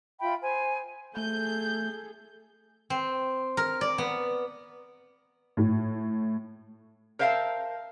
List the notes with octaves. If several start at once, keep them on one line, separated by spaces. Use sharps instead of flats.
F4 E5 G5 B5
C5 G#5
A3 G#4 A4 G6
C4
A#4
D5
B3
A2
A#4 C5 E5 F5 G5 A5